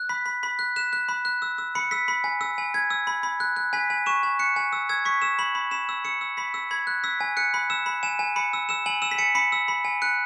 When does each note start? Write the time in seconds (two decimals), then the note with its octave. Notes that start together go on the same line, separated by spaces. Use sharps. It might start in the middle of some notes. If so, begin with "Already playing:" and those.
Already playing: F#6
0.09 B5 B6
0.26 B5
0.43 B5 B6
0.59 F#6
0.76 F#6 E7
0.93 F#6
1.09 B5
1.25 F#6
1.42 E6
1.58 E6
1.75 B5 C#7
1.91 E6 B6
2.08 B5
2.24 G#5
2.41 E6
2.58 G#5
2.74 G#5 G#6
2.90 E6
3.07 B5
3.23 B5
3.40 F#6
3.56 F#6
3.73 G#5 B6
3.90 G#5
4.06 C#6 E7
4.23 G#5
4.39 F#6 C#7
4.56 G#5
4.73 E6
4.89 E6 G#6
5.05 C#6 B6
5.22 E6 E7
5.39 B5 F#7
5.55 B5
5.71 B5 E7
5.89 E6
6.05 E6 C#7
6.21 E6
6.37 B5 B6
6.54 E6
6.71 B5 G#6
6.87 F#6
7.04 E6 B6
7.21 G#5
7.37 F#6 C#7
7.54 B5
7.70 E6 E7
7.86 B5
8.03 G#5 E7
8.19 G#5
8.36 B5 C#7
8.53 E6
8.69 E6 E7
8.86 G#5 F#7
9.02 E6 E7
9.11 B6
9.18 G#5 C#7
9.35 B5 C#7
9.52 E6
9.68 B5
9.85 G#5
10.02 F#6 C#7